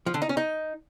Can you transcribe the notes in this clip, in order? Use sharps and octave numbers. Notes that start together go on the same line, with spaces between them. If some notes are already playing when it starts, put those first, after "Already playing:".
F3
D3
D#4
C#4
D#4